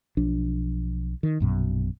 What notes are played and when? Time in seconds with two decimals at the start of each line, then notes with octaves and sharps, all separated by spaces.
0.17 B1 F3 D4
1.23 D#3
1.40 A#1 F#2 B2